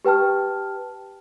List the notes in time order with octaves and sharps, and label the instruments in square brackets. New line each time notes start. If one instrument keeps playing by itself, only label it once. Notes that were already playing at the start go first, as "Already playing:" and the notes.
[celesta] G4 B4 G5 A5 F6